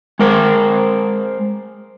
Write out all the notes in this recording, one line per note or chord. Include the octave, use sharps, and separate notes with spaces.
G#3 A#4 C5